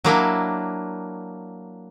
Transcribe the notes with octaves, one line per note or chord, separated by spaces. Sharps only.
F#3 A#3 D4 E4